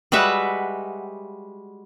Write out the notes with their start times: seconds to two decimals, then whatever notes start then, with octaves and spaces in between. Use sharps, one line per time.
0.12 G3 G#3 F#4 B4 E5 F#5